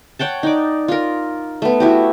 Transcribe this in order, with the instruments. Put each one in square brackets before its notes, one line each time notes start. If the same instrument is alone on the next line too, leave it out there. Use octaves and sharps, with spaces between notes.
[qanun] C#5 F#5 G5 A5
D#4 D5
F4 A#4
A3 B3
E4 F#4 G4